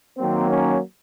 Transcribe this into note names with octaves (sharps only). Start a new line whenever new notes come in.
D#3 F#3 A#3 C4
C#4